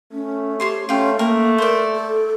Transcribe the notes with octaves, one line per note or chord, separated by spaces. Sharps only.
A3 C#4
G4 C5 C#5 C6
A3 C#4 F4 G5
A3 A#3 A#4
A#4 C5 D5
A4